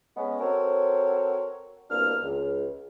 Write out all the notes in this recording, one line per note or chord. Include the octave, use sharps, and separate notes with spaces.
G#3 B3 C#4
C4 F#4 A4 A#4 C5 C#5
C2 B2 A#3 D4 F6
C#2